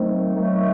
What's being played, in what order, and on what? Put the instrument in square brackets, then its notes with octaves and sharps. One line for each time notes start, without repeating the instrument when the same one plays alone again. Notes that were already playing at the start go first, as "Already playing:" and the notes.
Already playing: [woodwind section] D#3 F#3 A3 [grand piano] C4
[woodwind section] D#3 F#3 A3